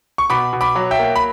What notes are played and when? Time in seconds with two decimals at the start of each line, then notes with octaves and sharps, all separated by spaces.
0.18 C#6
0.30 B2 B5 D6
0.53 B2
0.61 B5 D6
0.75 F#3
0.91 E5 G5
0.99 A#3
1.16 B5